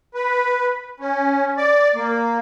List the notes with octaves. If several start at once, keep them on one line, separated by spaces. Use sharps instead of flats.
B4
C#4
D5
A#3